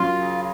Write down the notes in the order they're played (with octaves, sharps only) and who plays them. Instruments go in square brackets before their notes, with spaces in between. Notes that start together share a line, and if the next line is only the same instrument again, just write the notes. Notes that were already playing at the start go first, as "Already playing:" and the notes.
Already playing: [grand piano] F#2 F#3 [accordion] F4
[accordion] C#3